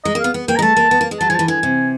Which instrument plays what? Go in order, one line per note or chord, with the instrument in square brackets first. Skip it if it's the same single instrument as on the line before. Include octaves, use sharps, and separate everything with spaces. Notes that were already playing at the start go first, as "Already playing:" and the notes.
[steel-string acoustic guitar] G#3 [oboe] D#5
[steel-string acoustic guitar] A#3
[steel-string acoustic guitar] B3 [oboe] F5
[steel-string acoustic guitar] B3
[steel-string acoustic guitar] A#3 [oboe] G5
[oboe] A#5
[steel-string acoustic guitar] G#3
[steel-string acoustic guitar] A3 [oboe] A5
[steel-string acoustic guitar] A#3
B3
A#3
G#3
[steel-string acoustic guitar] F#3 [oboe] A5
[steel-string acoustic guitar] F3 [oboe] G#5
[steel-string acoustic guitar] E3 [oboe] A5
[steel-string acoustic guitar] D3 [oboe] G#5
[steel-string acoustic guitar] C3